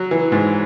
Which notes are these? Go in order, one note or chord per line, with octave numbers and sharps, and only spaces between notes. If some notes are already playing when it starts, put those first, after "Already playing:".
Already playing: F#3
E3
G#2